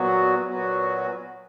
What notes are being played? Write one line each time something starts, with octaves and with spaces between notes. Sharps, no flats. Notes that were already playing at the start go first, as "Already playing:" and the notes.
Already playing: A#2 F#3 B3 F#4
A#2 F#3 B3 F#4